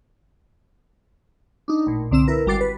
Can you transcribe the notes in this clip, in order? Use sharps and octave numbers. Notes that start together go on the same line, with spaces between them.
D4 D#4
A1 A#2
C2 D3 C4 E6 E7
E4 A#4 B4
G#1 G3 F#4 D6 A6 C7
B4